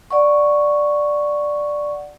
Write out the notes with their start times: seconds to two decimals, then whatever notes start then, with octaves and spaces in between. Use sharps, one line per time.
0.11 D5 F#5 C#6